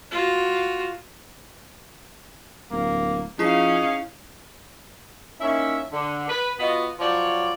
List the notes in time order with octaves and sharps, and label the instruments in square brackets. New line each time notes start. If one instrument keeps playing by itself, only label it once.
[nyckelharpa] F4 F#4
[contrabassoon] D1 [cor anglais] A#3
[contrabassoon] F3 [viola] C#4 F5 [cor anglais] D#4 [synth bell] E4 G#4 C7
[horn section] A#3 C#4 D#4 E4 E5
D3
B4
B3 F4 F#4 B4 D#5
F3 F#3 F4 C#5 D5